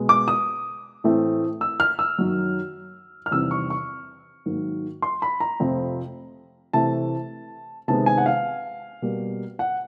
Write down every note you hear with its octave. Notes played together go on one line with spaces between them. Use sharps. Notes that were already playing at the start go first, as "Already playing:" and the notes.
Already playing: B2 G#3 B3
D6
D#6
A2 E3 A3 C4
E6
F6
E6
F#2 D#3 F#3
F6
E2 C3 D#3 G3 C4 E6
C#6
C#6
G#2 D#3 F#3 A#3
C6
B5
A#5
F2 C3 F3 A3 C4
C3 E3 A3 A5
C3 D#3 G#3 B3 A5
G#5
F#5
F5
B2 G3 A#3
F#5